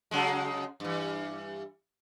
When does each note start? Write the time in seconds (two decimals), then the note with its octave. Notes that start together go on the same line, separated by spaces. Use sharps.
0.11 C#3 F#3 G#3
0.80 G2 E3